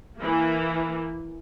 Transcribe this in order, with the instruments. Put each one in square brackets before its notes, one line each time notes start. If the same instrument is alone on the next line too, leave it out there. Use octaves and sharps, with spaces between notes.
[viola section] E3 A#3